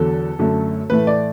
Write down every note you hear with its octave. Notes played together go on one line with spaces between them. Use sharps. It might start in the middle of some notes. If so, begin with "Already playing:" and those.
Already playing: E2 D3 F#3 A4
F#2 D3 A3
A2 E3 A3 B4
D5